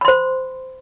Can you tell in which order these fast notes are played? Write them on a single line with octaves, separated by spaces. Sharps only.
B5 C6 C5